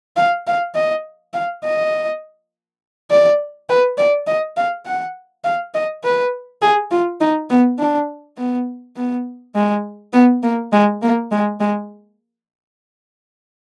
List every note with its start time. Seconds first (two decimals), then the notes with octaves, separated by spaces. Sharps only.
0.16 F5
0.47 F5
0.75 D#5
1.34 F5
1.64 D#5
3.11 D5
3.69 B4
3.98 D5
4.27 D#5
4.57 F5
4.86 F#5
5.44 F5
5.74 D#5
6.04 B4
6.62 G#4
6.91 F4
7.21 D#4
7.50 B3
7.79 D4
8.38 B3
8.96 B3
9.55 G#3
10.13 B3
10.43 A#3
10.73 G#3
11.02 A#3
11.31 G#3
11.60 G#3